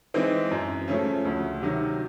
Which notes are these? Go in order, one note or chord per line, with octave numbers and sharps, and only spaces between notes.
E3 G#3 C4 D#4
F#2
C#3 F3 A3 C#4
D2
C3 D#3 F#3